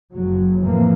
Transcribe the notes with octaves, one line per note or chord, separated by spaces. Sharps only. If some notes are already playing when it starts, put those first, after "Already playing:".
F#1 F#3
F2 A2 E3 F3 A#3